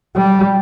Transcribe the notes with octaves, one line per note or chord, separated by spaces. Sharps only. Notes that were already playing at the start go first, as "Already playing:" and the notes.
G3